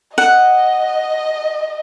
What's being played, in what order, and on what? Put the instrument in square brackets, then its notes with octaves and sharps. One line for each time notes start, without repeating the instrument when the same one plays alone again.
[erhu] D#5 [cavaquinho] F#5